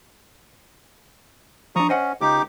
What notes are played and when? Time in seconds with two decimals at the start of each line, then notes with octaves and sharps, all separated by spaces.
1.76 F3 D4 A#5 C#6 D#6
1.89 C#4 C5 D#5 F#5
2.21 C#2 D#4 G4 D6